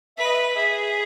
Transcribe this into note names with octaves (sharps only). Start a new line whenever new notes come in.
B4 E5
D#5
E5
G#4 E5